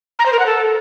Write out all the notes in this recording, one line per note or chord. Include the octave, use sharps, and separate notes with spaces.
A#5
C5
A#4
F#5
A4